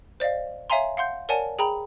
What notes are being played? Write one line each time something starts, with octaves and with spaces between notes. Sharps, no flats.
C5 D5 D#5 F5
C#5 E5 F5 G#5 A#5 C6
F5 F#5 C6 G6
A#4 C#5 D5 F#5 G#5 A5
G#4 G5 A#5 B5